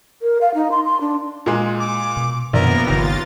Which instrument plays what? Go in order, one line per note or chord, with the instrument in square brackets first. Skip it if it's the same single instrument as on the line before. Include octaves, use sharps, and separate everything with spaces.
[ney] A#4
F5
D#4
C6
C6
D4
[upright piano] A#2 G#3
[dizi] D6
[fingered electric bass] B2
[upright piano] A#1 D5 [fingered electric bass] F#2 B2 D#3 [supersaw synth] A#3 B3 [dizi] A#4
[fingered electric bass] G1 C#3 F3 [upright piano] D#2 [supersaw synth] F4 A6